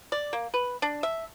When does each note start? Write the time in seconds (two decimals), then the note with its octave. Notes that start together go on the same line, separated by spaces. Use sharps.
0.12 D5
0.33 A#3
0.54 B4
0.82 D4
1.03 E5